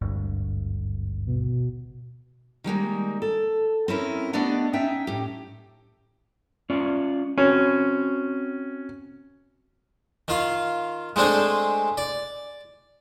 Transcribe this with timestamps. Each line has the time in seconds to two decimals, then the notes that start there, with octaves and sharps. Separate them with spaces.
0.01 G#1 D2 G2
1.27 B2
2.64 D#3 G3 G#3 A#3
3.22 A4
3.88 C4 C#4 E4 A#4
4.33 A3 B3 D4 G4 D5 D#5
4.73 C#4 D#4 E5 G5
5.07 A2 G4
6.70 C#4 F4 D5
7.38 C4 C#4 F#4
10.28 D#3 F4 F5
11.16 G#3 A3 C4 D4 G#4
11.97 D5